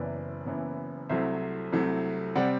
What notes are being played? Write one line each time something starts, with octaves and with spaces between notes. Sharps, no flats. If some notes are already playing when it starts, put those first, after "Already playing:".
Already playing: F#1 F#2 E3 B3 E4 B4 D5
F#1 F#2 E3 B3 E4
C2 C3 F#3 A3 E4 C5 E5
C2 C3 F#3 A3 E4
C3 G3 C4 D5 F#5